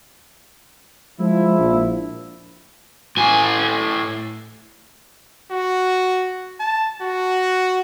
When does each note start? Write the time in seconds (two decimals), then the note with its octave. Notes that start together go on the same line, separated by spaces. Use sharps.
1.20 F3 G#3 E4
1.59 A#1
3.17 A2 G#5
5.50 F#4
6.60 A5
7.01 F#4